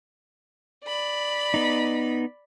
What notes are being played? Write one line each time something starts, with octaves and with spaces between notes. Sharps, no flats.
D5 B5
B3 D#4